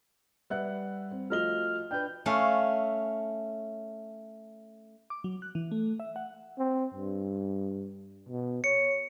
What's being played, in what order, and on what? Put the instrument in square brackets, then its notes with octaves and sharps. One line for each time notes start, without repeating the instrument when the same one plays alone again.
[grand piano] G3 F#5 F#6 [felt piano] B4 E5
[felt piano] C4
[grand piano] F3 D#5 G7 [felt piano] A3 F4 F#4 [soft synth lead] F6
[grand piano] D4 B4 [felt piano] G5 [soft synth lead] G6
[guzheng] A3 C#4 F5
[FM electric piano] D6
F#3
F#6
E3
A3
E5
F#5
[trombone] C4
G2
B2
[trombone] C#5 [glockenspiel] C#7